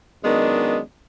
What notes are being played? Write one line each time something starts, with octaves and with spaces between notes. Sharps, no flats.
F#2 D#3 G#3 B3 D4